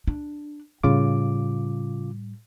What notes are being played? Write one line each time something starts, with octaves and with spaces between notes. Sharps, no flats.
D4
A2 C#3 G3 F4 D6